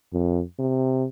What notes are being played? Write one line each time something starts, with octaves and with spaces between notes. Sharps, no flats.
F2
C3